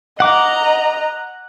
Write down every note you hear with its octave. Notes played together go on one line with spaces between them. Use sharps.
D#5 F#5 A#5 D6